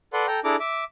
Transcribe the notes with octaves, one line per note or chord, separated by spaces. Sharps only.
A4 B4 D5 F#5 C6
A4 G5 A#5
D4 E4 G#4 A4 A#5 D6
E5 D6